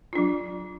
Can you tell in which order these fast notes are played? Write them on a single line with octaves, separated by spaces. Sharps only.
F4 D4 F#3